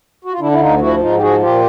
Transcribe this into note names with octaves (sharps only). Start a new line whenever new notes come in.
F#4
F4
D3 D4 E4
E4
D2 D#4 F4
F3 E4 F#4
G#2 D#4 F4
G4
F3 F#4 G#4
A#2 F4 G4